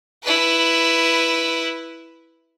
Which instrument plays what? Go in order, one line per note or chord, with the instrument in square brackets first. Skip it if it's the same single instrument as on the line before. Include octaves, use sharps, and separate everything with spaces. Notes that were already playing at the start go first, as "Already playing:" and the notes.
[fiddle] E4 B4